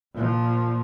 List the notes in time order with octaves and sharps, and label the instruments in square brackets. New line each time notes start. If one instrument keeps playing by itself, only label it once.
[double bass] A#2 F3